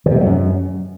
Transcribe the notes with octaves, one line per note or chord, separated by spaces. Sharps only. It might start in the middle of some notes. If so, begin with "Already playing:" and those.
D#3
C3
G#3
F#3
F#2